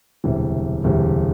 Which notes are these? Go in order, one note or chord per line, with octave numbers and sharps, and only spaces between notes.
E1 D2 C3 E3 G3
E1 D2 C3 E3 G3